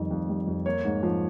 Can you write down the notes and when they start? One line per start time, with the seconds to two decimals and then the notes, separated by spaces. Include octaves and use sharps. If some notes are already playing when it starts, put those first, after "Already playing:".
Already playing: F2 D#3 G3
0.11 F2
0.29 G3
0.47 F2
0.66 A#3 C#5
0.85 G#2
1.03 F3